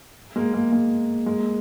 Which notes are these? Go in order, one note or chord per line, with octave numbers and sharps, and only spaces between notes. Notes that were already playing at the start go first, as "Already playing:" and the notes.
G#3 A#3
G#3 A#3
G#3 A#3
G#3 A#3